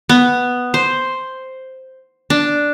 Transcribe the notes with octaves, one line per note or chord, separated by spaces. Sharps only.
B3
C5
D4